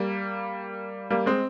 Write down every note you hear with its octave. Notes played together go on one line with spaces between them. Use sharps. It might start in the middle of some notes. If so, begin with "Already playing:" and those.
Already playing: G3 A#3
G3 A#3
G#3 C4